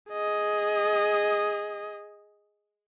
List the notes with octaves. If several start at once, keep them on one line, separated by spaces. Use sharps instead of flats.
G#4 D#5